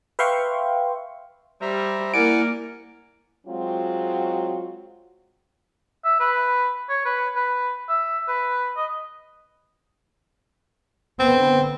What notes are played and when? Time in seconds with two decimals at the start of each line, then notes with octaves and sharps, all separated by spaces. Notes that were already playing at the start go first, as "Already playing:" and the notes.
0.19 B4 E5 F5 G5 C6 C#6
1.61 G3 C5 E5 A#5
2.14 A#3 E4 A#4 D5 F#5 G#5 D7
3.47 F#3 G#3 C4 F4 F#4
6.04 E5
6.20 B4
6.89 C#5
7.05 B4
7.36 B4
7.89 E5
8.28 B4
8.77 D#5
11.20 D3 B3 C4